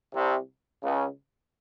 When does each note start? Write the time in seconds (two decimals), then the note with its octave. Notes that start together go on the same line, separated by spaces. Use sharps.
0.14 C2 C3
0.83 C#2 C#3